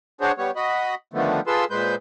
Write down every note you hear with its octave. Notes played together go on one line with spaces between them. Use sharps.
D4 F#4 G#4 C5 C#5
G3 B3 C#5
F#4 D#5 B5
D3 D#3 F3 A3 B3
F4 G#4 A4 B4 C6 E6
A#2 G#3 B4 C5 G6